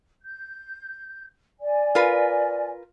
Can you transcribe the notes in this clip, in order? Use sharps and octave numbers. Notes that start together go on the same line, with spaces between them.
G6
D5 G#5
F4 A#4 B4